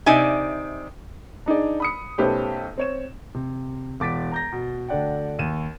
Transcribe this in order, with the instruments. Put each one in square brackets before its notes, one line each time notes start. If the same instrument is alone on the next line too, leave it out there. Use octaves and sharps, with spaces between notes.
[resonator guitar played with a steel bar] C3 D#4 D5 E5 G#5
[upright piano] D4 D#4 G#4 D5
B5 D#6 C#7
B1 A3 C#4 G4 B4 C5
C4 C#5 E7
[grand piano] C3
E1 D6 A6 B6 D7
A#5 G6 A#6
B2
D2 D3 D4 D5 F#5 G5
D#2 D#7 E7